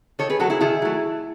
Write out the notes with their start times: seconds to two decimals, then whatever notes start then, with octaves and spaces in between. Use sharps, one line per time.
0.19 D#3 A4 C#5
0.30 G#4 B4
0.40 F#3 F#4 A4
0.43 A3
0.50 E4 G#4
0.61 D#3 E4 G#4
0.82 F#3 A3